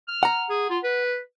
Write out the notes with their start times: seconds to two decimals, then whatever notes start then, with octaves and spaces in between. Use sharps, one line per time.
0.08 F6
0.23 F#5 A#5
0.50 G#4
0.70 F4
0.84 B4